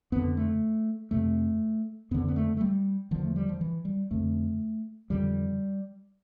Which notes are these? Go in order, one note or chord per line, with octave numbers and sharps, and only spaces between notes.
F2 D3 B3
A3
F2 C3 A3
F2 D3 B3
B3
A3
A3
G3
E2 D3 F3
A3
G3
F3
E3
G3
F2 D3 A3
F2 D3 G3